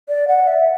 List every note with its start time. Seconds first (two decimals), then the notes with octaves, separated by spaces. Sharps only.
0.09 D5
0.28 F#5
0.47 E5